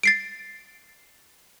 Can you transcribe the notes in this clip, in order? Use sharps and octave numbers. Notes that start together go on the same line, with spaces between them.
A6 C7 D7